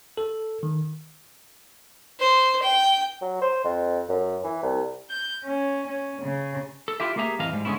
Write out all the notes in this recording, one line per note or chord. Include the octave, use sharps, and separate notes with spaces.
A4
D#3
C5
G5
F#3
C5
F2
F#2
E3
C2
G6
C#4
C#4
C#3
A4
E4 F4 G4 E5
A3 A#3 G4 G#4 E5 A#5
F2 A2 E3 D#5 F5
G#2 G3
D3 G#3 A#3 B3 C#4 E4